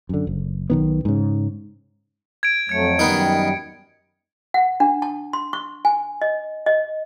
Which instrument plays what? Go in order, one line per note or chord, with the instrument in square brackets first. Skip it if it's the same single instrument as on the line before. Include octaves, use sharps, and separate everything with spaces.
[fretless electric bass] F#2 D3
F#1
B1 D#3 B3
G#2 C#3
[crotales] G#6 D7
[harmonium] F2 F#3 A3 [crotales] G#6 C#7
[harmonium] F#2 G3 [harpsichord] D#3 B3 D#4
[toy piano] F#5
D4
A5
C6
C#6
G#5
D#5
D#5